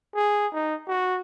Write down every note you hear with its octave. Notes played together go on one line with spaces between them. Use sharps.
G#4
D#4
F#4